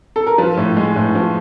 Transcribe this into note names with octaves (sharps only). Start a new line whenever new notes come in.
A4
A#4
F3 B4
A2
G#3
A2
F3